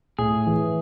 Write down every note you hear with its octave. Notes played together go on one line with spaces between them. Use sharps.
A2 G#4
E3